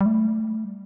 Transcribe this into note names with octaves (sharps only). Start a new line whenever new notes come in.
G3
A3
G3